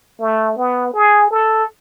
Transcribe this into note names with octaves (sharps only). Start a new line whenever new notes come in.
A3
B3
G#4
A4